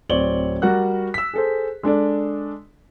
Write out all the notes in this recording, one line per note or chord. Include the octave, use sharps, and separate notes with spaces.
D1 C4 C#5 D5 F#7 G7
G3 F#4 A#4 F#5 F#6
E6 B6
G#4 A4 C5
G#3 D4 A4 D5